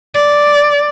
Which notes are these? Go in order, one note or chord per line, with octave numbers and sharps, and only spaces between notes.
D5